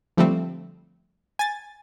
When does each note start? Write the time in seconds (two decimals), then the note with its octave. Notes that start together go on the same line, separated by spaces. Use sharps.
0.17 D3 F3 G3 A3 C4
1.39 G#5 A6